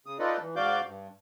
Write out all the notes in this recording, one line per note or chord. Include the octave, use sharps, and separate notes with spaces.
C#3 D#6
D#4 F4 A4 B4 D5 D#5
E3
G#2 F#4 D5 F5 D6 G6
G2